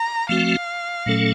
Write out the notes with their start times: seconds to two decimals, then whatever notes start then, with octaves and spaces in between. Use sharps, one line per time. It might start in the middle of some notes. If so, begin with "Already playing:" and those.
Already playing: A#5
0.29 F3 A3 C4 F#4 F5
1.06 A#2 F#3 A3 C#4 A4